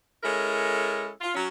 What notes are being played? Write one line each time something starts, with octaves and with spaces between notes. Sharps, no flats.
G#3 C#4 E4 A4 A#4
F4
F#3 C#4